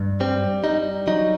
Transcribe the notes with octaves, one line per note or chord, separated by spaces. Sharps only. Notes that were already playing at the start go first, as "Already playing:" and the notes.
Already playing: G2
G3 C4
G3 D#4
F#3 D#4